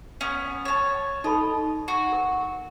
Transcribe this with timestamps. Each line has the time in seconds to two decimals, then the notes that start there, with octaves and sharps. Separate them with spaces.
0.21 B3 C#4
0.65 C#5 A5
1.24 D#4 A4 D#5 B5
1.88 F#4
2.12 A#4